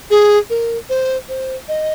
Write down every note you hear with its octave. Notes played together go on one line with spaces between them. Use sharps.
G#4
A#4
C5
C5
D#5